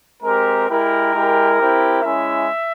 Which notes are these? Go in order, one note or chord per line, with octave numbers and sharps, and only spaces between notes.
G#3 C4 G4 A#4
G#3 E4 G4 A#4
G#3 E4 G4
C4 E4 G4
G#3 C#4 E4 E5